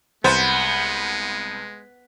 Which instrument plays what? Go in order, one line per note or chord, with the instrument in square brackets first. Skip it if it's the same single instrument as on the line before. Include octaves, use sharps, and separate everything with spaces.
[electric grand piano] C2 B5 [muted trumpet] G#3 [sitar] B3 [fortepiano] C5